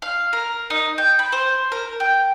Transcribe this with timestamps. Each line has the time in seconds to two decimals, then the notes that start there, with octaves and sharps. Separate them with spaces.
0.02 F5
0.33 A#4
0.70 D#4
0.98 G5
1.19 B5
1.32 C5
1.72 A#4
2.00 G5